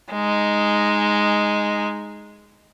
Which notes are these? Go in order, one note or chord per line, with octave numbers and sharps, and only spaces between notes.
G#3 D#4